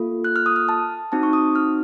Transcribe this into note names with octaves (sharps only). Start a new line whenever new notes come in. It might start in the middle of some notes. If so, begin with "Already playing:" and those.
Already playing: A#3 F4 A4
F#6
F6
D#6
F6
A5
C4 D#4 F#4 A5
C#6
D#6
F6